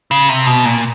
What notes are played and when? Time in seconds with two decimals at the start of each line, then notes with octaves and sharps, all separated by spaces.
0.11 C#3
0.29 C3
0.46 B2
0.65 A#2